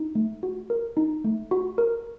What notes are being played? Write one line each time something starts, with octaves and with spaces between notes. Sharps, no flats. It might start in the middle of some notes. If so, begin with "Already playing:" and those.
Already playing: D#4
A3
F#4
A#4
D#4
A3
F#4
A#4